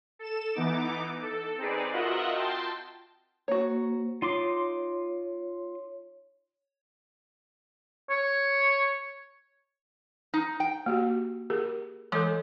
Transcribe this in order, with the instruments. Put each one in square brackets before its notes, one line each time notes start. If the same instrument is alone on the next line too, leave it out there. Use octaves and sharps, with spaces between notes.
[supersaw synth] A4 E7
E3 B3 D#4 D6
A4
C4 D#4 G#4 B4 D5
F4 F#4 A#4 D#5 E5 F#5
G5 A5 C6
[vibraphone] A#3 C5 [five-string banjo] F#4 C#5
[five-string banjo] D#4 [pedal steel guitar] F4 C6 D6 [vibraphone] C#5
[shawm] C#5
[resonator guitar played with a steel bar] D#4
G5
[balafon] A#3 F#4 G4
G4 G#4 A#4
[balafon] E3 A4 [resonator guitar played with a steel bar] G#3